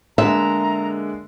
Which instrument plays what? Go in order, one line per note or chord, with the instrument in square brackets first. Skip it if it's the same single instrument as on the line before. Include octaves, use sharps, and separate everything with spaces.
[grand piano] D3 G#3 A#3 [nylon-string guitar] E5 [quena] A#5